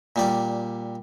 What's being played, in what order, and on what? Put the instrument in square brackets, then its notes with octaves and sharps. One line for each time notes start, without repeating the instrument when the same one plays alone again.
[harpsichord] A#2 G3 D5